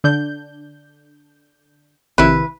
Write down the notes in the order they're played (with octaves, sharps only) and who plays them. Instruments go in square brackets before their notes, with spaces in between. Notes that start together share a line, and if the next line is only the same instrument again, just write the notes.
[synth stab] D3 D4 G6
[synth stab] A#1 C3 D#3 [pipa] E4 B4